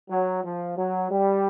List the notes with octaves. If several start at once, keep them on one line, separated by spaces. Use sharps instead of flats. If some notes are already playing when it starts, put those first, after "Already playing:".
F#3
F3
F#3
G3